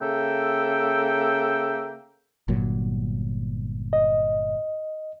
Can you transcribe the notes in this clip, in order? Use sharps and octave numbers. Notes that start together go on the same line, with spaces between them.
C#3 A#3 A4 E5 G5
G1 A#2 F#3
D#5